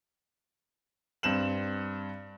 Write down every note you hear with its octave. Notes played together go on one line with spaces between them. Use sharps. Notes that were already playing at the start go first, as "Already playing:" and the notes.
G2 C4 E7 F#7